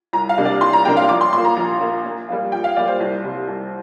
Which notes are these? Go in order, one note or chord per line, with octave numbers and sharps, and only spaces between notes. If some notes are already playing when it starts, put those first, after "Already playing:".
C2 A#5
F5
C3 G3 A#3 D4
D5
C2 C6
A#5
C3 G3 A#3 D4 G5
F5
A#1 D6
C6
A#2 A#3 C6
A#5
A#1
A#2 A#3
A#2
G3 A#3 F4
A#2 G5
F5
G3 A#3 F4 D5
C5
C2
C3 G3
C2